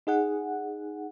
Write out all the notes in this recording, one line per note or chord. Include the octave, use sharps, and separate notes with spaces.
D#4 G#4 F#5